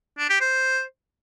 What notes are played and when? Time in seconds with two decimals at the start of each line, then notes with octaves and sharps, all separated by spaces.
0.18 D4
0.29 G4
0.40 C5